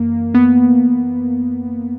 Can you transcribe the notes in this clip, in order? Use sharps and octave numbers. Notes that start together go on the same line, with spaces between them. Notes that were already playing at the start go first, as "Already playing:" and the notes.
Already playing: F#2 E3 A#3
B3